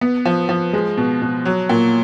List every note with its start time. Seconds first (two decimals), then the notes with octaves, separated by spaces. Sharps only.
0.01 B3
0.25 F3
0.49 F3
0.73 G#3
0.97 B2
1.22 B2
1.45 F#3
1.69 A#2